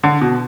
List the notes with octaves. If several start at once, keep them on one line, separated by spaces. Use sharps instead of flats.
D3
B2